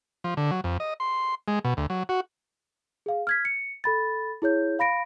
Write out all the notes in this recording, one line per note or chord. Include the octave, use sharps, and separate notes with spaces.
F3
D3
F#3
F2
D#5
C6
G#3
B2
D2
F#3
F#4
G#4 F5
F6 G#6 B6
C#7
A4 B5 A6
E4 G#4 C#5 G6
F5 B5 A#6 D7